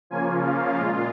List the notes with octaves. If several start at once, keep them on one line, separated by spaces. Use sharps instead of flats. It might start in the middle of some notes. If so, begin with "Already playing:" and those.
C#3 F3 A#3 C#4 F4 G#5
F5
A#2 G#3 F4